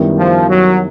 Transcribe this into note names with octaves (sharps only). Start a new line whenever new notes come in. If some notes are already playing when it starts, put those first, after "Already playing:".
Already playing: F#2 D#3 G3 B3 E4
F3
F#3